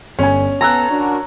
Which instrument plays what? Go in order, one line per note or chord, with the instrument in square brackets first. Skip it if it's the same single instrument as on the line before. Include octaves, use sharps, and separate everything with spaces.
[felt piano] G1 G#5 [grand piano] C#4 C#5
[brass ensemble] B3 A4 [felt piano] G#5 E6 F#6 [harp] A#5
[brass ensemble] D4 F#4 A#4